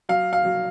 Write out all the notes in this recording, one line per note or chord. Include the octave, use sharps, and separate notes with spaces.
F#3 F5
F5
F#3